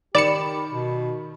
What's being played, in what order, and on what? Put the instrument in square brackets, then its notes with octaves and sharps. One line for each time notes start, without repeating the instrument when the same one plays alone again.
[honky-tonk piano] D#3 B5 E7 [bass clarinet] G4 [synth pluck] D5 C#7
[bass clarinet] B2